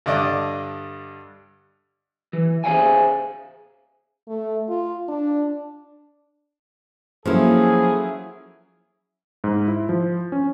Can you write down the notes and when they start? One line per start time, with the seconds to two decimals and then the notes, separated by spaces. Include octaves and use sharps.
0.06 G2 D3 D5 D#5 A5 D6
2.33 E3
2.64 G#4 C5 D5 E5 F5 G#5
4.28 A3
4.69 F4
5.09 D4
7.26 F3 F#3 A#3 C#4 E4 G#4 A4
9.44 G#2
9.68 E4
9.89 F3
10.32 C#4